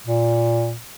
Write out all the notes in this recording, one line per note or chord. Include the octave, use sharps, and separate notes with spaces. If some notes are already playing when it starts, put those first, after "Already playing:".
A#2